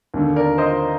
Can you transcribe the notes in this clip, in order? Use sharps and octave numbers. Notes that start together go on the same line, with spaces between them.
D#2 D3
A#4 D5
C5 D#5